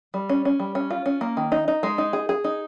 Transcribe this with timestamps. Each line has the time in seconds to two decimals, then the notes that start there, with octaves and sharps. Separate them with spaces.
0.14 G3
0.29 C#4
0.45 C#4
0.60 G3
0.75 C#4
0.90 F4
1.06 C#4
1.21 A#3
1.37 D#3
1.52 D#4
1.68 D#4
1.83 G#3
1.98 D#4
2.13 G#4
2.29 G#4
2.44 D#4